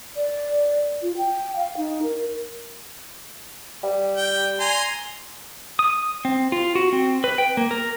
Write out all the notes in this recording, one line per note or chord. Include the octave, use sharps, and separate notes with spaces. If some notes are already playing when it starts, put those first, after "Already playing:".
D5
F4
G5
F5
D#4
A#4
G3
G5
G#5 A#5 C6
D#6
C4
F4
F#4
C4
B4
G5
A#3
A#4